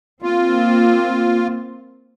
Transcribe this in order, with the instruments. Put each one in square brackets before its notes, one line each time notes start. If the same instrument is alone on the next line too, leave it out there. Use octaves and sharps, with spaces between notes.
[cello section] A#3 C4 [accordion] F4